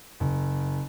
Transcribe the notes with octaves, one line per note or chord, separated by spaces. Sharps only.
F#1